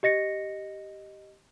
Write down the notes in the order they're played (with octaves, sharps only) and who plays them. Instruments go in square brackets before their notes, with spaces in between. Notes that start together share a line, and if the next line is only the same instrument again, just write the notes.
[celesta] G4 D#5 A#6 C#7